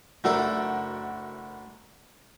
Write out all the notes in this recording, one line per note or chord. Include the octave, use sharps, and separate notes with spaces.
F#1 A3 D4 F#4 A4 A#4